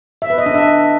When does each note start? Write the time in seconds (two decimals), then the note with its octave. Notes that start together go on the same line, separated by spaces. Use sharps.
0.22 E5
0.30 B4
0.38 D#5
0.46 D4
0.54 E5